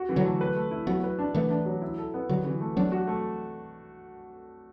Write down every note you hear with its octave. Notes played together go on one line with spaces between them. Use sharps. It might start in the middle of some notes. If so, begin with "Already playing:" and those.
Already playing: F#4
E3
D3 F#3
A3
B4
A3
E4
F#3 B3 F#4
B4
D4
E3 A3 B3
D4
F#3
E4
A4
B3
D3 F#3 F#4
E3
A3
F#3 B3 D4
F#4
A3